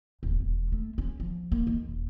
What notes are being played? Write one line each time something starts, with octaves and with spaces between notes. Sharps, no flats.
D1
E1
A3
C#4
F3
A#3
D#2
D#1